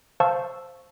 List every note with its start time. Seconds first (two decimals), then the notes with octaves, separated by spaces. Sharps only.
0.20 C5 F5 A5 C#6 E6